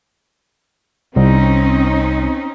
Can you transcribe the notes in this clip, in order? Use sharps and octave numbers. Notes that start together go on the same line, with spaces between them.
C2 C4 C#4 D#4